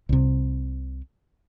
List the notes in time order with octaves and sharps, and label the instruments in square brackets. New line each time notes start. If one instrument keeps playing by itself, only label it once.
[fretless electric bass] C2 C3